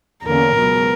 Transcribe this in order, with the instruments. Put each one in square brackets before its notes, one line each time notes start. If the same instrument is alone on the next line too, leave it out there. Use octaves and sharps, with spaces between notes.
[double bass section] E2 D3 A#3 C#4 [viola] A#4
[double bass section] C#2 B2 F#3 B3